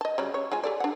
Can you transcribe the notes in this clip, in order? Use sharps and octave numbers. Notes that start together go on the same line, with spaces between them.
D#5 A5
C#3 F#3 G3
C#5
G#3 F4 G#5
G4 A4 D5
D4 F#5